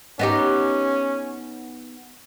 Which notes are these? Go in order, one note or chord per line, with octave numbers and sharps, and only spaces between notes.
B3 C#4 D#4 G4